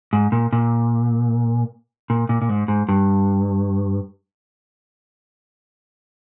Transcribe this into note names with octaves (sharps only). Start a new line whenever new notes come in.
G#2
A#2
A#2
A#2
A#2
A#2
G#2
G#2
G2